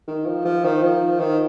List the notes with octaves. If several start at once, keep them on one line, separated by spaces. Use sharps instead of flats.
D#3
F3
F3
D#3
F3
D#3